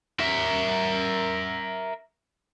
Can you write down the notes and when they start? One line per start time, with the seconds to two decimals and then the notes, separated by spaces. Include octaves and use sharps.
0.20 A#4 E5